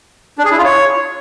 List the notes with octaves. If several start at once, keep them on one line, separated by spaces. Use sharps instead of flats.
D4
G#4
E4
F4
C#5